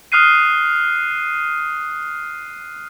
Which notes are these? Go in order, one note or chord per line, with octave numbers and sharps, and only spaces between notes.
D#6 F6 F#6 C7 D#7